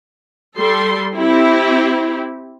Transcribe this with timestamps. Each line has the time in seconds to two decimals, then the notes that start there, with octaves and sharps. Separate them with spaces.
0.57 G3 A4 C6
1.16 C4 E4 G4